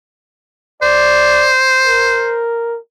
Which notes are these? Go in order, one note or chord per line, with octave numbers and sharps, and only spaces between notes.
C5 D5
A#4